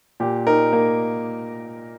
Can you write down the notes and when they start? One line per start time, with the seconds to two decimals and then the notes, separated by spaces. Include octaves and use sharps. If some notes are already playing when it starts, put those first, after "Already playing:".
0.20 A#2 G4
0.47 D#4 A#4
0.73 A#3